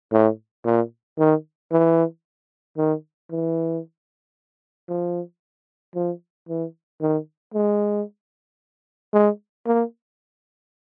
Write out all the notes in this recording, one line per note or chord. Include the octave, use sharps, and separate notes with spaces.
A2
A#2
D#3
E3
D#3
E3
F3
F3
E3
D#3
G#3
G#3
A#3